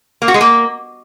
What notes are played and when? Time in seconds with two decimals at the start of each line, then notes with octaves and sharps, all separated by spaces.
0.22 A#3
0.28 F#4
0.34 G#3
0.41 A#3